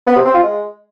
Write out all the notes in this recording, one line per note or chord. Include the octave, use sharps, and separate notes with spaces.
B3
C3
C4
F4
G#3